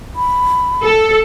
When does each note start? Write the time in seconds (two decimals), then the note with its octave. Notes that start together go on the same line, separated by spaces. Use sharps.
0.16 B5
0.84 A4